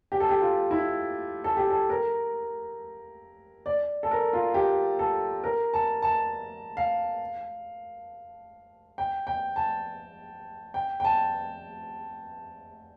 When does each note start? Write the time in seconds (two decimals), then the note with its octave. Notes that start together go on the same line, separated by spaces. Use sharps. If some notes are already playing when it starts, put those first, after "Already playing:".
0.12 G4
0.20 A4
0.29 G4
0.41 F4
0.71 E4
1.44 A4
1.57 G4
1.70 A4
1.90 A#4
3.66 D5
4.03 A4
4.11 A#4
4.33 F4
4.54 G4
4.99 A4
5.44 A#4
5.74 A5
6.02 A5
6.77 F5
8.98 G5
9.27 G5
9.56 A5
10.74 G5
11.00 G5
11.05 A5